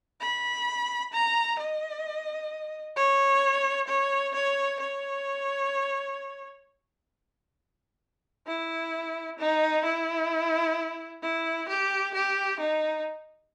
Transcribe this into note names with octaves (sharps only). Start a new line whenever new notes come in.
B5
A#5
D#5
C#5
C#5
C#5
C#5
E4
D#4
E4
E4
G4
G4
D#4